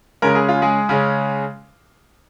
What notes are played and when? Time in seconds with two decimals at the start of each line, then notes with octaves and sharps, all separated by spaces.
0.22 C#3 G#3 C#4 A#4
0.35 G#4
0.49 F4
0.62 G#3 G#4
0.89 C#3 G#3 C#4